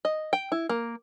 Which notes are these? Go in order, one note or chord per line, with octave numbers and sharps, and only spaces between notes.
D#5
G5
E4
A#3